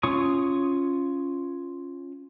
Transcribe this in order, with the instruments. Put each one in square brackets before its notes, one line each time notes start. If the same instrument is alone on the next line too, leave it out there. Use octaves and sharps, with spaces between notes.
[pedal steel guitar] C#4 F4 C#5 C#6 D#6